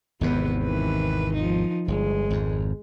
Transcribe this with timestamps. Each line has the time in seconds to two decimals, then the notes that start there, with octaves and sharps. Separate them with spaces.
0.21 G#1 E2 C3 B3 B4
0.64 D#3 E3 B4
1.34 F3 D#4
1.88 G1 G#3
2.30 G#1 F2